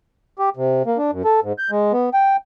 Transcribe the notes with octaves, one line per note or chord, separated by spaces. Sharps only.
G4
C3
A#3
D4
F#2
A4
G#2
G6
G#3
B3
G5